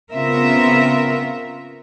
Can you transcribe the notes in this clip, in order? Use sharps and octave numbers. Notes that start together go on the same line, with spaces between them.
C#3 B3 C4 F4 A#4 E5